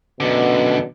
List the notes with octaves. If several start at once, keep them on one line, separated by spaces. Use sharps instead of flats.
F#2 B2 D3